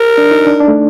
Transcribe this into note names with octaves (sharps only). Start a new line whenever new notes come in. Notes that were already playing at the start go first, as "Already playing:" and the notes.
Already playing: A#4
D4
D#4
D4
D4
A3